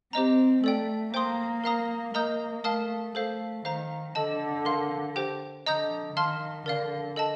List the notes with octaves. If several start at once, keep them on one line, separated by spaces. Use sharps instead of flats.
C4 G4 C5 D#5 A#5
A3 A4 D5 G5
A#3 C5 G5 C6 D#6
A#4 F5 A#5 D#6
A#3 A#4 D#5 A#5 D#6 G6
A3 A#4 F5 A5 D#6
A3 A4 C5 F5
D#3 C5 F5 A#5
D3 A4 D#5 A5
A#4 F5 C6
G4 C5 G5
D3 D#5 A#5 D#6 G6
D#3 F5 A5 C6 F6
D3 A#4 D5 F5
A4 D#5 A5